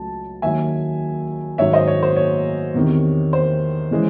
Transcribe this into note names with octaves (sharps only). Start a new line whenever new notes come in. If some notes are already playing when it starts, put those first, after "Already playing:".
Already playing: C#2 F#3 A3 A5
D#2 D#3 F#3 E5 G#5
G#2 D#3 F#3 C#4 C#5 E5
C5 D#5
C#5
C5
C#5
E2 C3 D#3
C5
C#3 E3 G#3